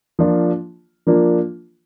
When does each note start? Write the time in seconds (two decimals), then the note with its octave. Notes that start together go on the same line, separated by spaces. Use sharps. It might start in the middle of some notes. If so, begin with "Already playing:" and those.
0.19 F3 A#3 D4 F4
1.07 F3 A#3 D4 F4